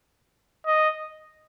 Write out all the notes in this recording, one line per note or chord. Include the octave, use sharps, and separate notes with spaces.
D#5